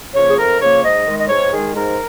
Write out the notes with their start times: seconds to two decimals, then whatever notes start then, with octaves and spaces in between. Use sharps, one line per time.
0.15 C#3 F3 A#3 C#5
0.29 G#4
0.38 F2 A#4
0.61 C#3 F3 A#3 C#5
0.84 G#2 D#5
1.07 D#3 G#3
1.20 D#5
1.29 G#2 C#5
1.53 D#3 G#3 G#4
1.75 G#2 A#4